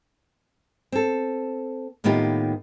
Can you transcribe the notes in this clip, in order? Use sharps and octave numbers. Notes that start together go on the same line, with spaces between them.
C4 A4
A2 D#3 A#3 B3 F4 G4